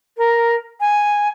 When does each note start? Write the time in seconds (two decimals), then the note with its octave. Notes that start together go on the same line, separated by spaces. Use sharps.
0.17 A#4
0.80 G#5